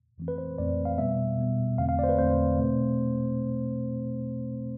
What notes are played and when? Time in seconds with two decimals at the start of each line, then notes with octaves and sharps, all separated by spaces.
0.18 F2 E3 A3 C4
0.28 B4
0.38 C5
0.58 F2 E3 A3 C4 D5
0.85 F5
0.98 B2 G3 B3 E5
1.38 B2 G3 B3
1.78 E2 D3 A3 C4 F5
1.89 F5
1.99 C5 D5
2.09 B4
2.18 E2 D3 A3 C4 C5
2.59 B2 A3 C4